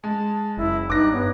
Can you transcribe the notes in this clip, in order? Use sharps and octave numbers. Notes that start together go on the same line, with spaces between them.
G#3 A5
F#1 E4
G2 D#4 D6 F#6 A#6
B3 C#5